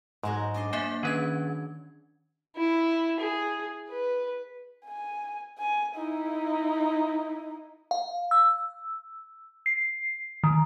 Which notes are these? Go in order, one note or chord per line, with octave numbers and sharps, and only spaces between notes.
G#2 F#3 G#3 F#4
D4 D#5 C6
A#3 C5 E5 G#5
D#3 C#4 G#4 B4 G#6
E4
G#4
B4
G#5
G#5
D#4 E4
F5
E6
C7
D#3